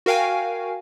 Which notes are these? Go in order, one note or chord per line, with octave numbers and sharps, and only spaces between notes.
F#4 A#4 F5 G5 G#5